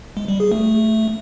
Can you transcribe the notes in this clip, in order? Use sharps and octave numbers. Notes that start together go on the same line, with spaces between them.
G#3
G3
G#4
A3